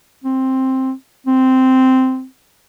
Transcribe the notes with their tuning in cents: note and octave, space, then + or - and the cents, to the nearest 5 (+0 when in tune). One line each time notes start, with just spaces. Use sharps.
C4 +5
C4 -10